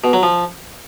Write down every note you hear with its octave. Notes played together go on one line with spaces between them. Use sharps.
B2
F#3
F3